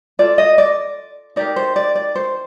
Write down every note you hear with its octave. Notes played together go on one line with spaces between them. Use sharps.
F4 A4 D5
D#5
D5
D#4 G4 A#4 D5
C5
D5
D5
C5